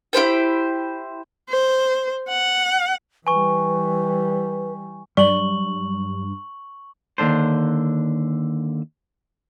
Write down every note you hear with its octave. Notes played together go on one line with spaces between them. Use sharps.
E4 G4 C5 G5
C5
F#5
E3 G3 B4 G#5 C#6
G2 F#3 G3 D5 C#6 F#7
D#2 B2 D3 D4 C5